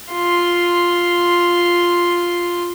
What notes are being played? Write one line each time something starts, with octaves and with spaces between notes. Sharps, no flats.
F4 C6